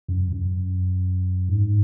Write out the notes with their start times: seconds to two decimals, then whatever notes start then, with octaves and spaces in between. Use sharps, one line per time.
0.08 F#2
0.32 F#2
1.49 G#2